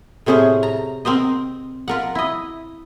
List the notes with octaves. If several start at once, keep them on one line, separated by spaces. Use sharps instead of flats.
A2 C3 C#4 G#4 C5
A#5
C4 A#4 C5 D#5
F4 A#4 F#5
E4 D#5